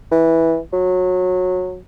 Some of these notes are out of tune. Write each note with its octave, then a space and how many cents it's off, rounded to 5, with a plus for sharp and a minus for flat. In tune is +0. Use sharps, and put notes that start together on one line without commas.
E3 -10
F#3 -20